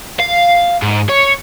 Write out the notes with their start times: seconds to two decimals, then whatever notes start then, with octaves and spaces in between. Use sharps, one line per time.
0.20 F5
0.82 G#2
1.09 C#5